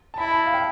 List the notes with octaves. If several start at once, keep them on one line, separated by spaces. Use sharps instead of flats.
A5
E4 B5
A5
F5
G5